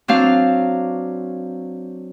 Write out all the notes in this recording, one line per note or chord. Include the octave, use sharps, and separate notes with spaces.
F#3 C4 D4 F5